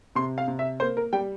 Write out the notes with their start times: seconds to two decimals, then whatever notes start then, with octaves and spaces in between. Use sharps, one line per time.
0.15 C3 C6
0.38 F5
0.48 C3
0.59 E5
0.80 A#3 C5
0.97 A#4
1.13 G3 G5